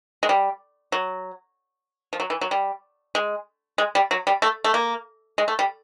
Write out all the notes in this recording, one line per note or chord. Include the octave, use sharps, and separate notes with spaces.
G#3
G3
F#3
F3
F#3
E3
F#3
G3
G#3
G#3
G3
F#3
G3
A3
A3
A#3
G#3
A3
G3